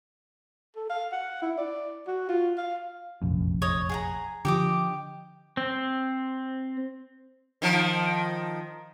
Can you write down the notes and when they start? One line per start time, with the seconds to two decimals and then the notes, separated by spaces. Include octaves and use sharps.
0.76 A4
0.90 F5
1.12 F#5
1.42 E4
1.58 D5
2.07 F#4
2.29 F4
2.58 F5
3.22 F1 A#1 F#2
3.62 C#5 D#5
3.89 G#4 F#5 A#5
4.45 D3 F3 G4 D#5 D6
5.57 C4
7.62 D#3 F3